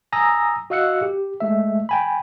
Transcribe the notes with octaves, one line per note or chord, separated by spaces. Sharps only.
G#5 A#5 D#6 E6 A#6
F#4 D#5 F5 E6 F#6 C#7
G4
G#3 A3 E5
G5 G#5 B5